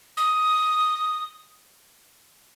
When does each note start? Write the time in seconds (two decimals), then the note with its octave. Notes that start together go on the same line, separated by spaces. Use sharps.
0.17 D#6